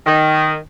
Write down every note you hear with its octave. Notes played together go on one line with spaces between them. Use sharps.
D#3